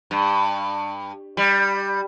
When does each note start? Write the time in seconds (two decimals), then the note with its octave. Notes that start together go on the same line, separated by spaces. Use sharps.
0.11 G2
1.37 G3